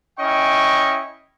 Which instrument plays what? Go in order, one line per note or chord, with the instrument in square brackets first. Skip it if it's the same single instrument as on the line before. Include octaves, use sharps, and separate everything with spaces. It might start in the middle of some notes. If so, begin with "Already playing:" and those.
[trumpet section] C#4 E4 D#5 G5 C#6